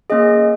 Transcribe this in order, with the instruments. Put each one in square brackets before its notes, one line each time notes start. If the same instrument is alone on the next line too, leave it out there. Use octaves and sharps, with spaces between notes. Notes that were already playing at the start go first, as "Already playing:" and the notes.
[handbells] A#3 C#4 G#4 D#5